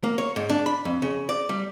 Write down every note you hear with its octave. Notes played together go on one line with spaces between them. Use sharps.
A#3
C#5
G#2
D4
B5
F2
C#3
D5
G3